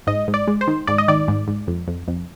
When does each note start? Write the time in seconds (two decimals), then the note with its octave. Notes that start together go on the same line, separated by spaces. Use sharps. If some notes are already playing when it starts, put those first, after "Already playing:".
0.07 G#2 D#5
0.28 G#2
0.34 D5
0.47 G#3
0.61 C5
0.68 D#3
0.87 G#2 D5
0.98 D#5
1.08 D#3 D5
1.28 G#2
1.48 G#2
1.67 F2
1.88 F2
2.08 F2